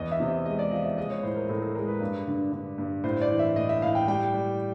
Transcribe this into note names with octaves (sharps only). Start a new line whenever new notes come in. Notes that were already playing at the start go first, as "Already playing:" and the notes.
Already playing: E2 D#5
E5
C3
E5
G#3 D#5
D5
F3 D#5
E5
G#3 D#5
C#5
A2 C5
A#4
A2 A4
A4
G#3 A#4
B4
G2
D3
D3
G2
A2 C5
D5
E3
E5
A2 D#5
E5
A2 F5
G5
G3 G5
G3